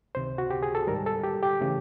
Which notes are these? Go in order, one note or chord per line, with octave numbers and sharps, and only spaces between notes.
C#2 C3 D#3 C5
F#4
G4
G#4
A4
G#2 D#3 G3 A#4
A4
G4
G4
C#3 E3 A3